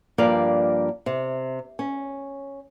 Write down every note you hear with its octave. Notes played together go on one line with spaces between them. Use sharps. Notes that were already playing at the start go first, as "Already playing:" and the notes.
G2 F3 A#3 D5 F5
C3
C#4